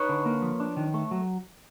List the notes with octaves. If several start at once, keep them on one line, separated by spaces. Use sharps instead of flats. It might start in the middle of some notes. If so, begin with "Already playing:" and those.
Already playing: D#4 B4 C#5
D3
A#3
F3
D4
D#3
A3
F#3